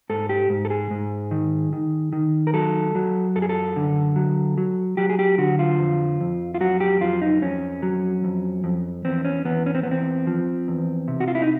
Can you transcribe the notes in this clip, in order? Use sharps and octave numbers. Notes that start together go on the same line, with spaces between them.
G#2 A4
G4
G#2
A4
G#4
G#2
D#3
D#3
D#3
A#4
F#3 A4
F#3
F#2 A4
G#4
A4
D3
F#3
F#3
F#3 G4
G#4
G4
D3 F#4
F4
F2
F2
F4
F#3 F#4
G4
F2 F4
D#4
F2 C#4
F#3
F2
F2
E2 C4
C#4
E2 B3
C#4
C4
E2 B3
C4
F3
E2
C3
F#4
F4
E4
D#4